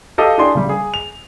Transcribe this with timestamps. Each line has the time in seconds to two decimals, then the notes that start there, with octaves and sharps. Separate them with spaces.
0.18 G4 A4 D#5 F5
0.38 D4 E4 G4 G#4 D5 C6
0.55 C#3 G3
0.69 G#4
0.94 F7